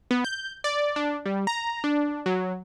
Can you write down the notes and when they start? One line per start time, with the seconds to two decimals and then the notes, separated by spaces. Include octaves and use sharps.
0.11 B3
0.25 G6
0.64 D5
0.96 D4
1.26 G3
1.47 A#5
1.84 D4
2.26 F#3